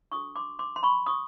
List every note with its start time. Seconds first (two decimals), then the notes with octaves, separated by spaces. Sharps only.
0.12 D4 F#4 A4 C#6 D#6
0.36 C6 D6
0.59 C6 D6
0.76 C6
0.83 B5 C#6
1.06 C#6 D#6